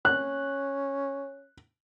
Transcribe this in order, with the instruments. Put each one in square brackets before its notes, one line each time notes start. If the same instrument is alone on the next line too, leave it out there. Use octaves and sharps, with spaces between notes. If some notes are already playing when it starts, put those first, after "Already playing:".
[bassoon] C#4 [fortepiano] F#6